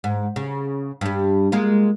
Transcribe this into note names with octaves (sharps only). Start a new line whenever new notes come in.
G#2
C#3
G2 G3
G#3 A#3 F4